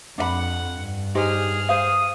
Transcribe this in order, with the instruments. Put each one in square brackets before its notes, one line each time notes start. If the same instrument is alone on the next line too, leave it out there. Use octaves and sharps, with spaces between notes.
[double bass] F2 [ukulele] D4 D#5 B5 [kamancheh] F#5
[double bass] G2
[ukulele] D#4 G4 C5 [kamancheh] G#4 F6
[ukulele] C5 F5 [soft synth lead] D#6